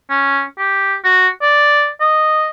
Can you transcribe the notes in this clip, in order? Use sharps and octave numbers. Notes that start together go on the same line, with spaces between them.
C#4
G4
F#4
D5
D#5